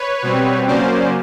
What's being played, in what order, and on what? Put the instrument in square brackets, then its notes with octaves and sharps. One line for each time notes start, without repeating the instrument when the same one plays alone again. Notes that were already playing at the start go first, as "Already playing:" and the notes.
Already playing: [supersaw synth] B4 C#5
B2 G3 C4
C#3 F#3 A#3 C#4 C5 D5